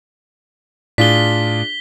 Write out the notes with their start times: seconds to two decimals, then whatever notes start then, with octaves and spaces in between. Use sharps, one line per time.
0.98 A2 D4 F4 G#4 B6 G7